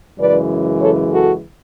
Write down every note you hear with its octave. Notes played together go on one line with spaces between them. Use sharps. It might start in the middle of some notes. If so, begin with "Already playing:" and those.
F#2 C#3 E3 G#3 B4 D5
A4 C#5
F#4 A4